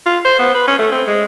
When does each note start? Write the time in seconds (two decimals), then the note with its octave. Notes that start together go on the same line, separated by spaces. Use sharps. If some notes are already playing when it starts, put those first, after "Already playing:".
0.06 F4
0.25 C5
0.39 B3
0.54 B4
0.67 C#4
0.79 A3
0.92 C4
1.08 G#3